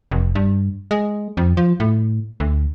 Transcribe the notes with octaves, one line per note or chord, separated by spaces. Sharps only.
F1
G2
G#3
F2
F3
A2
D2